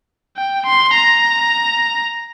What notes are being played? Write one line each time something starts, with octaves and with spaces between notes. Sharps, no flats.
G5
C6
A#5